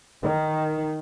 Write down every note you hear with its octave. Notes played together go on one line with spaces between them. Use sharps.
D#3